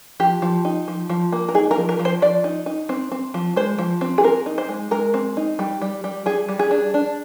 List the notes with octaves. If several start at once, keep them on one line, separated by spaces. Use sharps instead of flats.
F3 G4
F3
D#4
F3
F3
A#3
A#4
D#4 G#4
A#4
F3
A#4
F3
C5
F3 D5
D#4
D#4
C4
C4
F3
G#3 C5
F3
C4
G#4
C4 A#4
D#4
C5
G#3
G#3 A#4
C4
D#4
G3
G3
G3
G3 G#4
G3
G#4
D4
D4